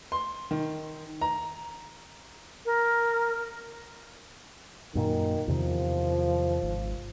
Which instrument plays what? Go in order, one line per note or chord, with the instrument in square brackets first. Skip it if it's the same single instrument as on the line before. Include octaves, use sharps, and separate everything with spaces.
[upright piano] C6
D#3
A#5
[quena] A#4
[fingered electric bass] F#2 A#2 [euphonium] D#3
[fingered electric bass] E2 C3 D#3 [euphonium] F3
[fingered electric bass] G#1